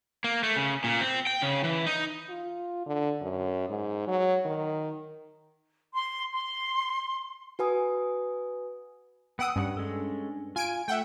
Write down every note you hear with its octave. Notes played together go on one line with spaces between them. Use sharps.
A#3
A3
C#3
A#2
C4
G5
C#3
E3
D#4
F4
D3
F#2
G#2
F#3
D#3
C6
C6
F#4 B4 G#5 D#6
B3 F#5 G5 D#6 E6
G2 C#4 F#5
G#3 C#4 A4
F4 G#5 D7
A3 E5 F#5 G5